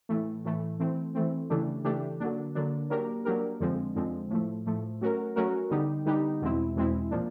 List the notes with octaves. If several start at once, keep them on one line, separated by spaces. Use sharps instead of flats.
A2 E3 A3
A2 E3 A3
E3 A3 C4
E3 A3 C4
C#3 E3 A3 D4 G4
C#3 E3 A3 D4 G4
D3 F#3 A#3 D4
D3 F#3 A#3 D4
F#3 A#3 D4 G4 A#4
F#3 A#3 D4 G4 A#4
F2 D3 F3 G#3 C4
F2 D3 F3 G#3 C4
A2 F3 A3
A2 F3 A3
F#3 A3 C#4 F#4 A#4
F#3 A3 C#4 F#4 A#4
D3 G3 B3 D#4 G4
D3 G3 B3 D#4 G4
E2 B2 G#3 C4 E4
E2 B2 G#3 C4 E4
A#2 F3 A#3 D4